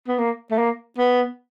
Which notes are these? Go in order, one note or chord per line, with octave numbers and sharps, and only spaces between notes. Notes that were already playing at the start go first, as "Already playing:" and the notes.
B3
A#3
A3
A#3
B3